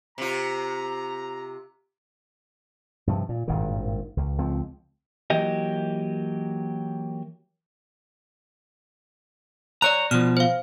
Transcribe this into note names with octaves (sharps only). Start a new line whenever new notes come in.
C3 F4 A#5
G2 C3 F3
A#2
G#1 G2 A#2 D#3
C#2
C#2 F3 C4
E3 F#3 A#3 G4 D#5
C#5 D5 A#5 F#6
B2 F3 F6
C5 F5